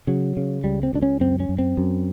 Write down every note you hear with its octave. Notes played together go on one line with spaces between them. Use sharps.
C#3 F#3
C#3
C#2 G3
C4
C#2 D4
C#4
F#2 C4
C#4
F#2
C4
F#2